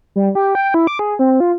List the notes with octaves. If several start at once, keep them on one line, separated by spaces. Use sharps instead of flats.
G3
G4
G5
E4
D6
G#4
C4
F4